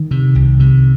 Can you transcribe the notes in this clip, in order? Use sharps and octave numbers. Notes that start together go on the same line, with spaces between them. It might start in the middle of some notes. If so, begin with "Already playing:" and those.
Already playing: D#3
C3
C2
C3